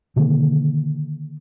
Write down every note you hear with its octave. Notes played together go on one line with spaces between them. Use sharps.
B2 D3 D#3 A#3